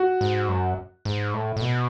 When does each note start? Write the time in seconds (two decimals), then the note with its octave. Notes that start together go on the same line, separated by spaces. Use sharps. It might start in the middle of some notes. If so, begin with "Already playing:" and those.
Already playing: F#4
0.21 G#2
0.49 F#2
1.05 G#2
1.34 A2
1.56 A2
1.62 B2